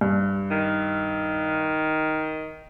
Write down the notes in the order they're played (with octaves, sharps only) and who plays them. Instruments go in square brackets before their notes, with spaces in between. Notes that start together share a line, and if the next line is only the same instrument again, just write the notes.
[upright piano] G2
[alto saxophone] D#3